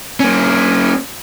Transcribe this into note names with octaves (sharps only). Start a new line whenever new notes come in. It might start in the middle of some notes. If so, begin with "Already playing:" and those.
A#3 C#4